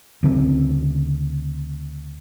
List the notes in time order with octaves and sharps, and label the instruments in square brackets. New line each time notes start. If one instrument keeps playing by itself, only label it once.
[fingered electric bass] D2 C#3 G#3 C4